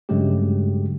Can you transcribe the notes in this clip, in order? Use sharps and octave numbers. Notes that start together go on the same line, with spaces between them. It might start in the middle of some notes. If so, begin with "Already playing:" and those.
G2 C#3 F#3 G#3 A3 G4